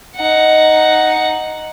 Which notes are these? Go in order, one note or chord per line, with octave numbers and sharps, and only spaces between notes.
D#4 F#5